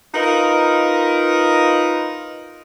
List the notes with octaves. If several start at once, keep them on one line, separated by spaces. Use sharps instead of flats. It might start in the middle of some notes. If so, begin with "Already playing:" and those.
D#4 F4 A#4 B4 D#5